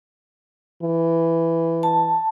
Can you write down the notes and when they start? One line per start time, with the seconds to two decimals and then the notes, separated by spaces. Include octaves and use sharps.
0.83 E3
1.83 A5